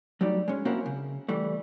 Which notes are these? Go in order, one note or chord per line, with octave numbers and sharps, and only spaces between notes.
F#3 G3 A3 D#4 D5
G#3 C#4
A#3 C4 C#4 E4 F#4 A#4
C#3
E3 G3 A3